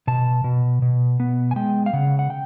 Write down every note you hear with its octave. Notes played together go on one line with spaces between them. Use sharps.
B2 A5
B2
B2
B3
G#5
G#3 G5
F5
C#3 F#5
F#5
G5